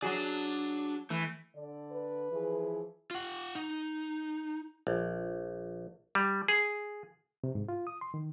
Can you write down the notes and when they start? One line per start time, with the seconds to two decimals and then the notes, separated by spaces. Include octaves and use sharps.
0.02 F#3 D4 F#4 G#4 D5
1.10 E3 A3
1.56 D3 D5
1.91 B4
2.32 E3 F3 G#4
3.11 F4 F#5
3.55 D#4
4.87 A#1
6.15 G3
6.48 G#4
7.44 C3
7.55 G#2
7.69 F4
7.87 D#6
8.01 C6
8.14 D#3